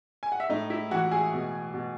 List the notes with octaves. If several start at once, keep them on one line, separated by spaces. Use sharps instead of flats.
G#5
F#5
E5
A2 D#4 D#5
E4 E5
E3 F#4 F#5
G#4 G#5
B2
B2